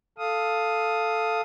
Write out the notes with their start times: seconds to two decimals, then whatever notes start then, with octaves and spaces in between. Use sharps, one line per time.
0.18 A4 F5 D#6